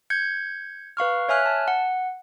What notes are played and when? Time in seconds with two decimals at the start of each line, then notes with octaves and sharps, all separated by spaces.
0.10 G6 G#6 C#7
0.97 B4 F5 C#6 F6
1.29 C#5 E5 G#5 F6 F#6
1.46 A5
1.68 F#5